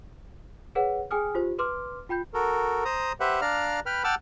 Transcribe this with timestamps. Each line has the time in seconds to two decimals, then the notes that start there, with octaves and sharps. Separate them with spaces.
0.75 G#4 B4 C#5 F#5
1.11 G#4 G5 G#5 D#6 F6
1.35 F4 G4 C5
1.59 B4 C6 D6 F6
2.09 F4 G5 B5 G6
2.33 F#4 A4 A#4
2.85 C5 A#5 D#6
3.20 G4 B4 C5 E5 F#5
3.41 D4 D5 F5 A#5 F6
3.86 B4 G5 B5 F6
4.04 F#5 G5 A5 D6 E6 F6